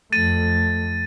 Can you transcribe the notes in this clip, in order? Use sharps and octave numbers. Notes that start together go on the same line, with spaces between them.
F2 A3 A6 D#7